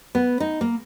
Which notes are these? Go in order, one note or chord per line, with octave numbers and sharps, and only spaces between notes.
B3
D#4
A#3